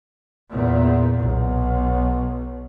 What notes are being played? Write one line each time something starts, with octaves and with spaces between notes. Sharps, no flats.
E2 A#2
B1